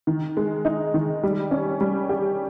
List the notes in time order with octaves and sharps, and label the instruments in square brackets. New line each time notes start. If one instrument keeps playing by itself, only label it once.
[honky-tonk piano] D#3
G#3
D#4
D#3
G3
C#4
G3
G4